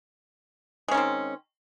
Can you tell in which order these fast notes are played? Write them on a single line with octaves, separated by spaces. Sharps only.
G#3 C#4 D#3 C4